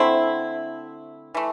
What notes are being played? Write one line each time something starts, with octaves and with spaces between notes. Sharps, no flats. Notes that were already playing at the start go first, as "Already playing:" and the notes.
Already playing: D3 A3 C4 E4
E3 A3